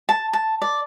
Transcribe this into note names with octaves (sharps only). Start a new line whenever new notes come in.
A5
A5
D5